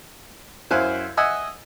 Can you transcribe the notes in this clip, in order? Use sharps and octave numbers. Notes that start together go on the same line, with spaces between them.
F#2 E4 C5 F5 G#5 F#6
D#5 E5 F#5 G#5 E6